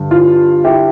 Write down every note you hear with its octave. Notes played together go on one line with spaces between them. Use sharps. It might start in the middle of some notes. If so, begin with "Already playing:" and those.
Already playing: G2 D3
F4
E4 G4